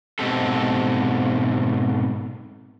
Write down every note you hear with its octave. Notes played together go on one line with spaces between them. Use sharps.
G#2 B2 C4 G4 A4